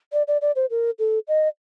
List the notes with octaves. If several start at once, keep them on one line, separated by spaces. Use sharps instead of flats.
D5
D5
D5
C5
A#4
A4
D#5